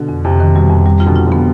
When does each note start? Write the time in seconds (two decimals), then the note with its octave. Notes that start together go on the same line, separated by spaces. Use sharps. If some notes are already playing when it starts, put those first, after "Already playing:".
Already playing: B2 D3
0.09 F2
0.25 F2 C3
0.40 D#3
0.55 B2 G3
0.70 F2
0.85 C3 G3
1.00 F4
1.05 B2 D3
1.16 F4
1.26 D3 F3
1.32 B3